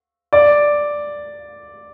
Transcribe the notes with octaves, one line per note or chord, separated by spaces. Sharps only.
D5